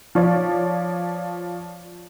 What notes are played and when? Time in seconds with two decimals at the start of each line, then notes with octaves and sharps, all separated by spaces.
0.15 F3 C#5 D5